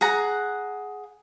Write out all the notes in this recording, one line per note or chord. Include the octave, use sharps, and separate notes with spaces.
G#4 F#5 A#5